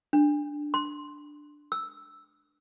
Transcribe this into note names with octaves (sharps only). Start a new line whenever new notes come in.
D4
C6
E6